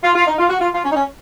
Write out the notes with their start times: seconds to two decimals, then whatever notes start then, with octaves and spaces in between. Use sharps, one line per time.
0.04 F4
0.15 F4
0.27 D#4
0.38 F4
0.50 F#4
0.61 F4
0.74 F4
0.84 C#4
0.92 D#4
0.96 C#4